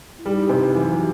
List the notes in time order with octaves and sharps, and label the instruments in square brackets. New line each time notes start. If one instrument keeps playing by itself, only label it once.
[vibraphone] E4
[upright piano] G3 [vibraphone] D#4
[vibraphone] D#4
[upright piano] C3 [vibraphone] E4
[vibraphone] G4
[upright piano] E3 [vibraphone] F#3 F#4